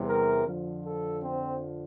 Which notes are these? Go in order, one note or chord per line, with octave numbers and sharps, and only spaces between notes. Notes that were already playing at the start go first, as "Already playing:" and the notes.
Already playing: E2 C3 G3
A#4
F2 D3 F3
A4
C4